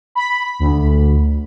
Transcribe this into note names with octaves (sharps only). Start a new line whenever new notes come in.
B5
D2